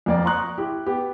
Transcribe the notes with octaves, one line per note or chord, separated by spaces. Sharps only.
F2 A#3 D5
A#5 C6 C#6 D#6 F#6
E4 G4
B3 G4